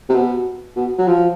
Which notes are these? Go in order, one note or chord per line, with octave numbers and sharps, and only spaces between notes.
C3
B2
B2
F#3
F3